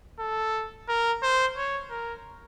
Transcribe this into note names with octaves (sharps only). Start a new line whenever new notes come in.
A4
A#4
C5
C#5
A#4